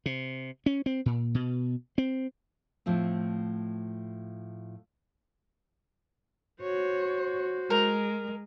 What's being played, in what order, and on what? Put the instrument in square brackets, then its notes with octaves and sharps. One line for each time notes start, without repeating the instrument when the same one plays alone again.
[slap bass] C3
C#4
C4
A#2
B2
C4
[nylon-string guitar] A2 F3 A3 C4
[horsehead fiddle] F#4 C5 [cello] C#5
[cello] G#3 [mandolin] A#4